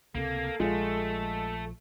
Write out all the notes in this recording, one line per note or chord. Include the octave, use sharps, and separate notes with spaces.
C#2 C3 A#3 C4 A4
A#1 F3 G#3 A3 F4